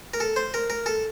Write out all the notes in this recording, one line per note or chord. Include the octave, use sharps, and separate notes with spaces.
A#4
A4
C5
A#4
A#4
A4